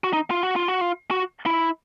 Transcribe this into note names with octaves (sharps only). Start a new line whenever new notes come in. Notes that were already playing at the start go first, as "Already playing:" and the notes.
F#4
D#4
F4
F#4
F4
F#4
F4
F#4
E4